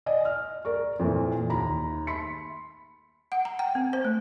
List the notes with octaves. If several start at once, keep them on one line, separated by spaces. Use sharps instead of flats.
D5 D#5 G#5
F6
A#4 D5 C#6
F2 A#2 E3
D#2 A#5 B5
B5 C6 B6 C#7
F#5
A#5
G5
C4
C5
A3